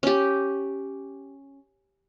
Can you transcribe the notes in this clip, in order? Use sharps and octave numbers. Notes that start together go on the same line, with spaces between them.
C#4 G4